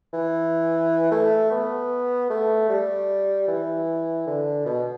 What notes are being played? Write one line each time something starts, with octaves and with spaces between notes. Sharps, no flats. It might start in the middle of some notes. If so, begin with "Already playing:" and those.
E3
A3
B3
A3
G3
E3
D3
B2